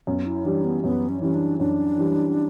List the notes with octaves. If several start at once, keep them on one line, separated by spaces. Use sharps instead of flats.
F#2 B3
E4
E3 G3 D4
B3
F#2 B3
C#4
E3 G3 C#4
D4
F#2 D4
E3 G3